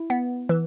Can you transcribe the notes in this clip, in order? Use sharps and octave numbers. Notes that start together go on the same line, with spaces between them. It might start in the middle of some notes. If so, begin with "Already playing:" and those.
Already playing: E4
B3
E3